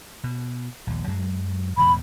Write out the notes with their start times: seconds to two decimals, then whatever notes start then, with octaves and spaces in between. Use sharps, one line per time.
0.24 B2
0.87 A#1 D#2
1.07 F#2 F#3 G#3
1.77 E1 E2 A2 B5